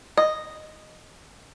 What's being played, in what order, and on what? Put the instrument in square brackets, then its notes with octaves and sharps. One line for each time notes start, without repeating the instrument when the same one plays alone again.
[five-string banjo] D#5